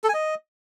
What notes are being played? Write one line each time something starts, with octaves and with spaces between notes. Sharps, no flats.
A4
G#5
D#5